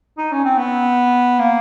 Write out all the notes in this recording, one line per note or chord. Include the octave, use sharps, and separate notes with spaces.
D#4
C#4
C4
B3
A#3